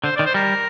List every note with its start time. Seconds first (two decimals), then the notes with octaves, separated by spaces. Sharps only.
0.04 D3 C5
0.16 D#3 D5
0.26 C5
0.34 G3 A#4